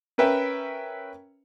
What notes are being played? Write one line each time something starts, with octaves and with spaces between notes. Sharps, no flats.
C#4 A#4 B4 E5 G5